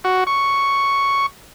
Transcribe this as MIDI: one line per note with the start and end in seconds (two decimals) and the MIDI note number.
0.04 0.24 66
0.27 1.26 85